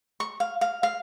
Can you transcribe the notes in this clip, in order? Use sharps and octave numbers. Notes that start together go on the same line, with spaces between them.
C#6
F5
F5
F5